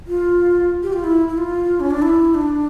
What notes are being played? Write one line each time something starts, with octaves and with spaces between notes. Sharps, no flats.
F4
G4
F4
E4
E4
F4
C#4
D4
E4
D4